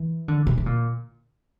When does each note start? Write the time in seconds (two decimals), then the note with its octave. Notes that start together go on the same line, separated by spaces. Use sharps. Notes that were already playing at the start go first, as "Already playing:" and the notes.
Already playing: E3
0.28 D3
0.47 C3
0.58 C3
0.66 A#2